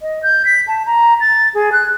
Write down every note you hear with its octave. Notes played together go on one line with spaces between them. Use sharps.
D#5
G6
B6
A5
A#5
A6
G#4
F#6